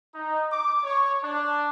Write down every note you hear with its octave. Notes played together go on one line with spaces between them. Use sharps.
D#4
D6
C#5
D4